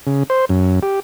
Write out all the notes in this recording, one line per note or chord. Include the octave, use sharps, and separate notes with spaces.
C#3
C5
F#2
G4